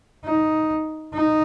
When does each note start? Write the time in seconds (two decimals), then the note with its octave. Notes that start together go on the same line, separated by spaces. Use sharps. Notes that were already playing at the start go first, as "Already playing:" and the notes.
0.24 D#4
1.14 D#4